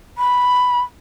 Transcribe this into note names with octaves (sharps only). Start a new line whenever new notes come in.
B5